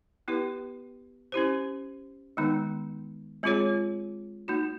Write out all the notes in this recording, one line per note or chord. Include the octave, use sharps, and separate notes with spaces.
B3 E4 G4 B4
C#4 E4 G4 C5
D#3 G#3 B3 D#4
G#3 C4 F4 G#4 C#5
A#3 D#4 F#4